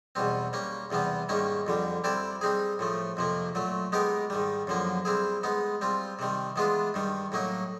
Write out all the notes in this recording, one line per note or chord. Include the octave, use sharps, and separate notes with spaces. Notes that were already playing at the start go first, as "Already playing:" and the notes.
E2 B2 G3 C4
G3 A#3 C#4
E2 C3 E3 G3 B3
G#2 D#3 G3 A#3 C#4
F2 D3 G3
G3 C4 E4 A4 D5
G3 C4 D#4 G#4
A2 F3 A3
F2 C3 F3 A#3
A#2 F#3 A3
G#3 B3 D#4 G4 A#4
G#2 D#3 G3
F#2 D3 F3 A#3
G3 C4 E4 G#4
G#3 B3 D#4
G3 C4 F4
C3 D#3 G3
E3 G#3 B3 D4 F4
G2 D#3 G3
A2 F#3 A#3 D#4